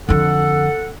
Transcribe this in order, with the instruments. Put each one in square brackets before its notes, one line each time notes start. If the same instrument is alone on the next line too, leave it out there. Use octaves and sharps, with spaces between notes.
[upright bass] F2 D3 [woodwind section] A4 F#5